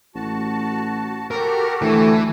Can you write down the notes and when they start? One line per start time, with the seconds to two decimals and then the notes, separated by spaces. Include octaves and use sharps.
0.15 A1 F#4 A5
1.31 F#4 G4 A4 A#4
1.82 D2 E3 A3